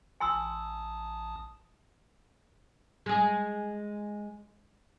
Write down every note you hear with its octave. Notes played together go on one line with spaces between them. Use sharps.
A1 G#5 A5 C6 D#6 E6
G#3 G#4